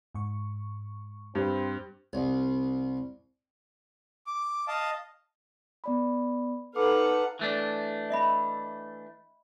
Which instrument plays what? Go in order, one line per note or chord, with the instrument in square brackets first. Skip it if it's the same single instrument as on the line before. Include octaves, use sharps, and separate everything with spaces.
[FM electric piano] G#2 C#6
[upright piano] G2 [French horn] C4
[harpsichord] C2
[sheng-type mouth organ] D6
D#5 F5 A5
[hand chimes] B3 D5 B5
[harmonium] D#4 A4 B4 [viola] F5 F#5 [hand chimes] D6
[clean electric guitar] E3 A3 D4
[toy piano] D#5 E5 B5